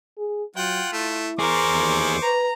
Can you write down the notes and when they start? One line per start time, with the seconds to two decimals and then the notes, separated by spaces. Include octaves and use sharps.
0.18 G#4
0.56 F#3 F4 F#5 G5
0.93 A3 E4
1.39 E2 G#4 A#4 C5 C#6 D6
1.71 D#2
2.22 B4 A#5